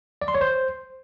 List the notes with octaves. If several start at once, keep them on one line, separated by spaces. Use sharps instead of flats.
D5
C6
C#5
C5